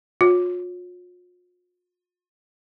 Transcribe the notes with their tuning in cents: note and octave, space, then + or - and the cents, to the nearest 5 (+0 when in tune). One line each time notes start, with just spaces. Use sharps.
F4 +40 C#5 +0